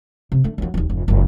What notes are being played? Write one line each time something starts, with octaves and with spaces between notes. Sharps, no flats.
C3
D3 A3
D#2 F#3
D1 D#2
F1 G#2
F#1 C#2